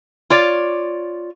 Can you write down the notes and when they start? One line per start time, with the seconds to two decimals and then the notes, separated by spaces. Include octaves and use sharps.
0.30 F4 C#5 D5